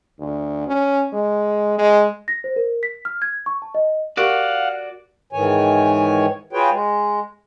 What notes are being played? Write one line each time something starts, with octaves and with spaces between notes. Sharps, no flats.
D2
C#4
G#3
G#3
A#6
C5
A#4
B6
F6
G#6
C#6
A5
D#5
F#4 G4 A#4 D5 F5 F#5 C#6
G#2 D#3 E3 C#5 G#5
F4 F#4 G#4 B4 C#5 G5
G#3